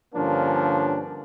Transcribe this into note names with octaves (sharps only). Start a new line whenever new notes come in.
G2 D3 F3 A#3 C#4 D4